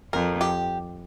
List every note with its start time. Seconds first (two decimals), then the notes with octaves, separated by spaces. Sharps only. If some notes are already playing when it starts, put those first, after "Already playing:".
0.13 F2 A#4
0.41 G4